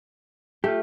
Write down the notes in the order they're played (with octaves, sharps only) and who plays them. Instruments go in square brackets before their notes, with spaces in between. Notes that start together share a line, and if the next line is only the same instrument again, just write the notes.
[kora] A3 [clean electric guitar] F4 G4